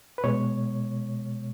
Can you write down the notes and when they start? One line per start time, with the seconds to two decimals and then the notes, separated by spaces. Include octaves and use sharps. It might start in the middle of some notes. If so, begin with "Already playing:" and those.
0.18 B4
0.24 B2 G#3 C#5